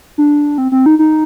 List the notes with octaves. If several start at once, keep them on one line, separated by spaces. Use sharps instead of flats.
D4
C4
C4
D#4
D#4